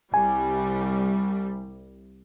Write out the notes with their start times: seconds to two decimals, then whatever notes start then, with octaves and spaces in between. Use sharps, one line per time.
0.14 C2 G3 G#5